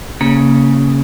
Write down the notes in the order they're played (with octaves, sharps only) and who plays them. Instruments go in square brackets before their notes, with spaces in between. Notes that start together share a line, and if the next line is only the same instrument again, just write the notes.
[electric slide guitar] C#3 [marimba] A#3